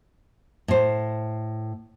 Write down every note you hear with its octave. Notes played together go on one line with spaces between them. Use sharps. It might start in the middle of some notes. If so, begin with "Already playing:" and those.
A2 C5